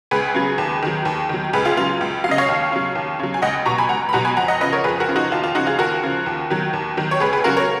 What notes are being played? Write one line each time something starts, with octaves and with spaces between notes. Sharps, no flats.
C#2 G#4 B4
C#3 F#3
D#2
D#3 F#3
D#2
D#3 F#3
C#2 G#4 B4
F4 G#4
C#3 F#3 F4
C#2
C#3 F#3 D#5 F5
C#5 F5
D#2
C#3 F#3
D#2
C#3 F#3
G#5
C#2 D#5 F#5
B2 F#3 A#5 C#6
G#5 B5
C#2 F#5 A#5
B5
B2 F#3 F#5 A#5
G#5 B5
F2 F#5 A#5
D#5 F#5
C#3 F3 B4 D#5
A#4 C#5
F2 G#4 B4
F#4 A#4
C#3 F3
D#4 F#4
D#2 F4
F4
C#3 F3 D#4 F#4
F4 G#4
D#2 F#4 A#4
C#3 F3
D#2
D#3 F#3
D#2
D#3 F#3
C#5
C#2 G#4 B4
G#4 B4
C#3 F#3 F#4 A#4
A#4 C#5